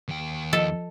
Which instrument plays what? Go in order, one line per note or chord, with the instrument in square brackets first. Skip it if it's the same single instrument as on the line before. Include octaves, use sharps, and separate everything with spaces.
[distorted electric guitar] D#2 G5
[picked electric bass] F3 [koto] A4 [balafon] D#5